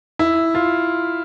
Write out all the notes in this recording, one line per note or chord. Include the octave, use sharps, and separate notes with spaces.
E4
F4